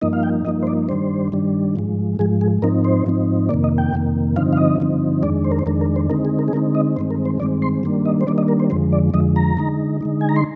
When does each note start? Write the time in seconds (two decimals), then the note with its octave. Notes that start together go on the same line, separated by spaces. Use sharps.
0.01 G2 F3 A#3 D#4 D#5
0.13 F5
0.23 G5
0.45 G2 F3 A#3 D#4 D#5
0.63 C5
0.67 D5
0.89 G2 D#3 G3 D4 C5
1.32 G2 D#3 G3 D4
1.76 G#2 F3 G#3
2.19 G#2 F3 G#3 G#4
2.41 G#4
2.62 G#2 F3 C4 D#4 A#4
2.85 C5
3.06 G#2 F3 C4 D#4
3.49 F2 C3 D#3 A#3 D5
3.64 D#5
3.78 G5
3.92 F2 C3 D#3 A#3
4.36 G2 D3 F3 C4 D#4 F5
4.53 F5
4.57 D#5
4.80 G2 D3 F3 C4 D#4
5.23 F2 D#3 G#3 D4 D5
5.44 C5
5.52 A#4
5.59 C5
5.66 F2 D#3 G#3 D4 A#4
5.81 A#4
5.96 C5
6.10 D3 G#3 C4 D#4 A#4
6.25 G#4
6.39 A#4
6.48 G#4
6.53 D3 G#3 C4 D#4 A#4
6.75 D#5
6.96 G2 D#3 G#3 C4 C5
7.11 A#4
7.25 C5
7.40 G2 D#3 G#3 C4 D5
7.62 C6
7.83 D#3 G3 A#3 D4
8.06 D#5
8.21 C5
8.27 D#3 G3 A#3 D4 D5
8.38 D#5
8.48 A#4
8.60 C5
8.70 F2 D3 F3 G#3 C5
8.93 D5
9.14 F2 D3 F3 G#3 D#5
9.36 A#5
9.57 D3 G#3 D#4
10.01 D3 G#3 D#4
10.21 G#5
10.29 A#5
10.36 C6